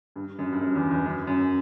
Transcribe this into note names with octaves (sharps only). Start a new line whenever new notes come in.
G2
F#2
G2
F#2
E2
E2
F#2
F#2